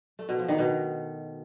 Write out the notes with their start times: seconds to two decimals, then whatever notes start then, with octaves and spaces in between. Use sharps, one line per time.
0.19 A3
0.29 B2
0.39 F3
0.48 D#3
0.58 B2